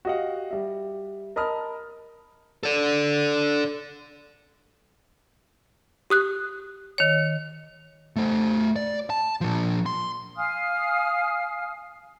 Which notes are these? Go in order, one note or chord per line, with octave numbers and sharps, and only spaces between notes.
F#4 G4 D#5 F5 F#5
G3 E5
A#4 D#5 A5 B5 D#6 F6
A4 D5
G4 D#6 F#6
D#3 C#5
A3 C5
D5
A5
A#2 F3
C6
F5 G#5 D#6 F6